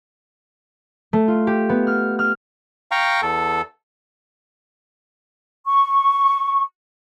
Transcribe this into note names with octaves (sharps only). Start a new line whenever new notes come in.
A3
F4
G4
B3
F6
F6
F5 G5 A#5 C#6
E2 A4
C#6